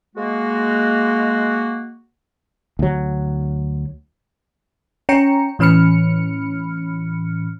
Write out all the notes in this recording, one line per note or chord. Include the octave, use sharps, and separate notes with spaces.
G#3 A#3 F#4
D2 F#3
C#4 C#5 G5 A#5 C#7
A2 E3 C#4 B5 F6 C#7